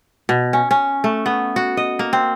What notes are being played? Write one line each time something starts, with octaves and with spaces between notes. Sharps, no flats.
B2
C#4
C#4
A3
B3
F#4
D#5
A#3
C4